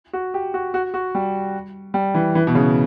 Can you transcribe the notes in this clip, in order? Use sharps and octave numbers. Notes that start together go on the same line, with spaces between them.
F#4
G4
F#4
F#4
F#4
G3
G3
E3
E3
B2
C#3